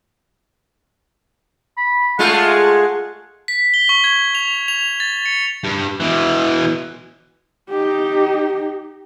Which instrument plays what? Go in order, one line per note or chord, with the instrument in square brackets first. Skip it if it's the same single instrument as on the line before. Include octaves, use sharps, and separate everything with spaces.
[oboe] B5
[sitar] G#3 A3 F4 [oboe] F#5
[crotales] B6
G7
C#6
G#6
F7
F7
A6
C#7
[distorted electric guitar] G2
B2 E3
[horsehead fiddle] D#4 G4